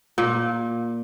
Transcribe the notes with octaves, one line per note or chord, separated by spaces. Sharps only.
A#2